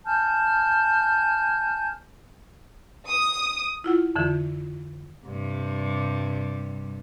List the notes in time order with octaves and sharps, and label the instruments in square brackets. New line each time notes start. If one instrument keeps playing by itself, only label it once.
[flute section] G#5 A5 F6 G6
[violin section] D#6
[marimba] E4 F4 F#5
F2 D3 E3
[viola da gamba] G2 C3 G3